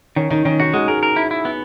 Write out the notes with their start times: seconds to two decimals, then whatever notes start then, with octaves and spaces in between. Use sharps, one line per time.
0.16 D#3 C#4
0.31 D#3 D#4
0.45 D#3 C#4
0.60 D#4 F#4
0.74 G#3 F#4
0.88 G#4 A#4
1.03 A#4
1.16 E4
1.31 E4
1.45 B3